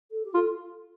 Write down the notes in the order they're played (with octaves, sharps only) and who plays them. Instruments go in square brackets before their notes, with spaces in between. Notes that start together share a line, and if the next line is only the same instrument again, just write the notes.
[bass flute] A4
G4
[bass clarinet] F4 [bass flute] A4